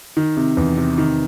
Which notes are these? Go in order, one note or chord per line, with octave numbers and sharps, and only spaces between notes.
D#3
C3
E2
C3
D#3